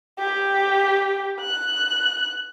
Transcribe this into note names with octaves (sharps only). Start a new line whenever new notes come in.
G4
F#6